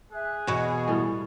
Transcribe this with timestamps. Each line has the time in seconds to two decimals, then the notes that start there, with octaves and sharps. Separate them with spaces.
0.12 G#4 E5 F#6
0.47 E2 B2 C#5 D#5 C#6
0.88 A2 G3